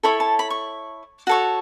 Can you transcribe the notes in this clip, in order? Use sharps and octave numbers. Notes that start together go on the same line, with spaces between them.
E4 A4 C#5 B5
A5
B5
C#6
F#4 A4 C#5